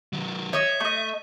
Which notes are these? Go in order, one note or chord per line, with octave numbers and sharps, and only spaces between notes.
D#3 F#3
C#5 D#5 E5
A3 D#5